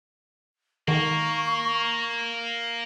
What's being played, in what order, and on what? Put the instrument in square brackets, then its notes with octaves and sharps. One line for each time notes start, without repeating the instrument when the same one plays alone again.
[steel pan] D#3 [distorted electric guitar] A#3 [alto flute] C#6